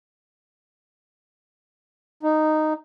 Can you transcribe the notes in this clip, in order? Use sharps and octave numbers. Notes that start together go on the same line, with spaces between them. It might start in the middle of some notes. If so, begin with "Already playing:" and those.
D#4